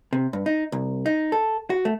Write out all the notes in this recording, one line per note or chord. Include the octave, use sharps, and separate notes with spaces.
C3
G2
D#4
C2
D#4
A4
F#4
A3